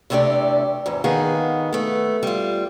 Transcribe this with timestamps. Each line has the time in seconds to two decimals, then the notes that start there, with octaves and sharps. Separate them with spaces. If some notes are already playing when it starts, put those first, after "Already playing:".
0.10 E2 C3 A3 D4 G4 D5
0.86 E2 G#2
1.04 D#3 B3 G#4 F5 F#5
1.73 A3 B3
2.23 G3 F4